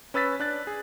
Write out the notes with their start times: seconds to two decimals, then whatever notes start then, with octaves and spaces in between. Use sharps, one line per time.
0.14 C#4 B4 E6 A6 B6
0.40 D4 F#6 A6
0.67 G#4